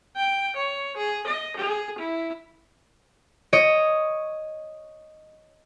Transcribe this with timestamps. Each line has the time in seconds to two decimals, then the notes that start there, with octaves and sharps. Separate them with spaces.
0.17 G5
0.56 C#5
0.97 G#4
1.28 D#5
1.57 G#4
1.99 E4
3.53 C#5 D#5 D7